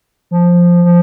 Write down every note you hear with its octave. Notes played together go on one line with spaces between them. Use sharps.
F3
F3